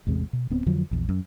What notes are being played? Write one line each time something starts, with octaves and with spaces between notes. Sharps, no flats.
A1 E2 C3 G#3
B2
D1 B3 C4
F2 D3 F3 F#3
A#1 E2
F#2